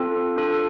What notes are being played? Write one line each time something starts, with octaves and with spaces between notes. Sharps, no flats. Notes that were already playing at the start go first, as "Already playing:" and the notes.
Already playing: C4 F4 A4
D4 F4 A4